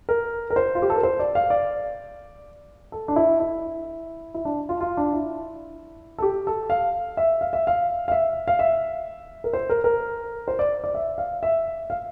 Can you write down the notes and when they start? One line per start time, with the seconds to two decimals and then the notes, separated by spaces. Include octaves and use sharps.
0.09 A#4
0.50 A#4
0.56 C5
0.75 F4
0.82 G4
0.90 A4
0.96 A#4
1.03 C5
1.20 D5
1.35 F5
1.50 D5
2.92 A4
3.08 D4
3.16 E4
3.40 E4
4.34 E4
4.45 D4
4.69 F4
4.81 F4
4.97 D4
5.13 E4
6.18 A4
6.22 G4
6.47 A4
6.70 F5
7.17 E5
7.41 F5
7.53 E5
7.67 F5
8.08 F5
8.12 E5
8.48 F5
8.59 E5
9.44 A#4
9.53 C5
9.70 A#4
9.84 A#4
10.48 C5
10.59 D5
10.84 D5
10.95 E5
11.18 F5
11.43 E5
11.90 F5